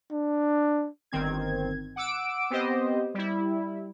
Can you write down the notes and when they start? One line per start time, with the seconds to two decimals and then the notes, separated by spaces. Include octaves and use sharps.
0.12 D4
1.12 G1 D#3 C4 G#6
1.96 F#5 D6 E6 D7
2.50 B3 C4 G4 C5 D#5
3.14 G3 E4